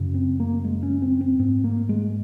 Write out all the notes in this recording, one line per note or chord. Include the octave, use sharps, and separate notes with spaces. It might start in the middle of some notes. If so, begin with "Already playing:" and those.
Already playing: F#2 C#3
C4
A#3
G#3
C#4
C4
C4
G#2 C4
A#3
G#3